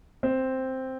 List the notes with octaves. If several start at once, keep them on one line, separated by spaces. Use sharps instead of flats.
C4